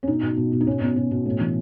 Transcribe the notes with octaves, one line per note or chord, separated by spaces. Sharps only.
C#4
B2 D#4
B2
B2
B2
D#4
B2 C#4
B2 B3
B2 C#4
B2
A2
E3